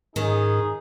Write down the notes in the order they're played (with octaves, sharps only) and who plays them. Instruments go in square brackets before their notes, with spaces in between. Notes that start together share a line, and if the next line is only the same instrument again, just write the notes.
[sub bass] G#2 [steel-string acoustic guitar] D#3 C#4 [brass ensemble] D#4 G#4